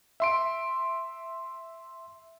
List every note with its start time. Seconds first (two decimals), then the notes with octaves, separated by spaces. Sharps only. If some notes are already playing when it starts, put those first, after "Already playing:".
0.20 E5 C6 D7